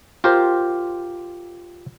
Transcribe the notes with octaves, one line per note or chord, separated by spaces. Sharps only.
F4 G4 A#4 C5